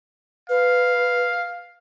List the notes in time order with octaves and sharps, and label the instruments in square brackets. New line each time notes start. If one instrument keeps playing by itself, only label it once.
[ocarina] B4 [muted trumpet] F5